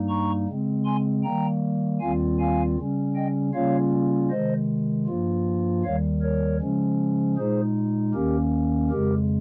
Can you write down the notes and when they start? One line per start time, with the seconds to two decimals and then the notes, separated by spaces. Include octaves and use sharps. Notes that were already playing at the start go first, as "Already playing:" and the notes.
Already playing: G2 G3 A#3 D#4
0.09 A#5 C#6
0.48 C#3 G#3 C4
0.85 G#5 C6
1.23 D#3 G3 A#3 G5 A#5
2.00 D#2 D#3 G3 C4 F4 F5 G#5
2.39 F5 G#5
2.77 C#3 G3 C#4
3.16 D#5 G5
3.53 C#3 G3 A#3 C#4 F4 C#5 F5
4.30 C3 D#3 G#3 C5 D#5
5.07 G2 F3 A#3 F4
5.83 D#2 D#3 G3 C#5 F5
6.22 A#4 C#5
6.60 C#3 F3 G#3 C#4
7.37 A#2 G#3 D#4 G#4 C5
8.14 D#2 D#3 A#3 C#4 G4 A#4
8.90 F2 C#3 G#3 G4 A#4